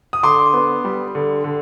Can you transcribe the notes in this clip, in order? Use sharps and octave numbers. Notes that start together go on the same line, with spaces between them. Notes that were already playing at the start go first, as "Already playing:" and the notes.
D#6
D3 C6 D6
B3
G3
D3
D3